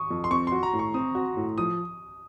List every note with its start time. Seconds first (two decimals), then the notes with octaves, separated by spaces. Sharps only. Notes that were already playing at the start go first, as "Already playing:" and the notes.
Already playing: C#6 D#6
0.11 F2
0.24 C6
0.31 C4 C#6
0.47 F#4 C6
0.63 A#5
0.73 A2
0.79 C#6
0.94 C4 D#6
1.15 F#4
1.37 A2
1.58 F3 D#6